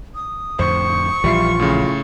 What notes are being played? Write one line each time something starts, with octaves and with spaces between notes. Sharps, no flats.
D#6
F2 A2 D3 C5 C#6
A#1 E3 F3 G3 F4 E5 C7
A2 C#3